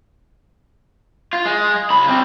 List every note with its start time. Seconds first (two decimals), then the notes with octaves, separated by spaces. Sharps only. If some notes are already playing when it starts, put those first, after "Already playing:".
1.33 F4
1.45 G#3
1.90 C#2 B5
2.08 G3 C4